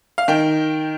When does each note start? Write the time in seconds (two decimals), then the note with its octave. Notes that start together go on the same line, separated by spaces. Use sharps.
0.18 F5
0.28 D#3 G5